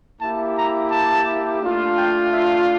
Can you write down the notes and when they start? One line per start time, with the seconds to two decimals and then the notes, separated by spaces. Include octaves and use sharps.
0.20 A#3 E4 G4 A5
0.56 A#5
0.91 A5
1.62 A3 D4 F4
1.97 G5
2.33 E5